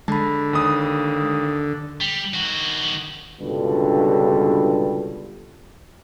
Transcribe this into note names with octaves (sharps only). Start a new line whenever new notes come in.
D3 G#3 A5 B5
D#2 D#6
G3
D#3 F#4
C#2 G2 B2 D3 G3